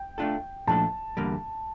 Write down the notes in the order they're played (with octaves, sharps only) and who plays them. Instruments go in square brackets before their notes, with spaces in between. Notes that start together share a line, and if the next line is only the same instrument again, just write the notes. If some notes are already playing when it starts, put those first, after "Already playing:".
Already playing: [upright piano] G5
[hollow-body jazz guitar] A3 D4 F4 A4
[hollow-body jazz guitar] A#2 F3 A3 D4 A4 [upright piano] A5
[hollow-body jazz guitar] E2 D3 G3 A#3